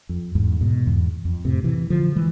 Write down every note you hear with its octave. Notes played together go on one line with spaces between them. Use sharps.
F2
E2 G#2
G#2 B2
E2 G#2
F2
A2 C3
C3 E3
D3 F3
E3 G#3